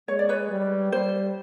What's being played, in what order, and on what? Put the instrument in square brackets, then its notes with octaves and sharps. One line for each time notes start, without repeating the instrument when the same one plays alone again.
[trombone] G#3 [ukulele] C#5
[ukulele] D5
B4 C#5
[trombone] G3
[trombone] G3 [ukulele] C5